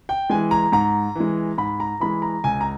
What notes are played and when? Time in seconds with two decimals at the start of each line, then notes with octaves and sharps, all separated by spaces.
0.09 G5
0.30 E3 G#3 G#5
0.51 A#5
0.72 G#2 A#5
1.15 E3 G#3
1.58 G#2 B5
1.80 A#5
2.00 E3 G#3 B5
2.22 A#5
2.44 C#2 G#5
2.61 A#5